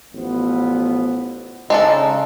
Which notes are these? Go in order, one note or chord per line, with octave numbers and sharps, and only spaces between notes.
A1 F3 B3
C#3 G#3 D4 D#4 A4